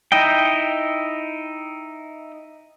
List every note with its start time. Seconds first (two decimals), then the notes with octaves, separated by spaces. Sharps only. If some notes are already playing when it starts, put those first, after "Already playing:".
0.12 D#4 E4 D#5 G5